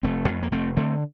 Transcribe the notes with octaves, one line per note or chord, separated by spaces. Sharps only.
F1 A3 C4
F2
A#3
F1 A3 C4
D3 A3 C4